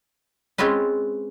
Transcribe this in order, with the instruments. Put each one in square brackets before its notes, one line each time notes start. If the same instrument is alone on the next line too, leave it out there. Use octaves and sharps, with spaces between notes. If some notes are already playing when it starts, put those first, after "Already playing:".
[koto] G#3 C4 C#4 F4 B4